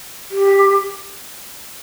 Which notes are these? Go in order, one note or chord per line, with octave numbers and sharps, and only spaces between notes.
G4